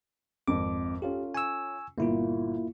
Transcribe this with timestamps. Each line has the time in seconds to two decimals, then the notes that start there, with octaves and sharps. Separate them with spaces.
0.48 G#1 F2 D6
1.02 C#4 F4 G4 A4
1.34 G#5 C#6 E6
1.98 G1 A#2 A#3 E4 F4